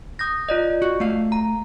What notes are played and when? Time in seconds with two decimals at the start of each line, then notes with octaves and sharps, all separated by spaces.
0.19 D#6 G6 A#6
0.49 F4 D5 D#5
0.82 F#4
1.00 A3 F5
1.32 A#5